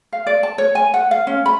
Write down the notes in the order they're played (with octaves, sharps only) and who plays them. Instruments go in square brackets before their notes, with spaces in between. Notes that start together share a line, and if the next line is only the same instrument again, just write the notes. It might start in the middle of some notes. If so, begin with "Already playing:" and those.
[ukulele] F5
D5
A5
C#5
G#5
F#5
F5
C#4
B5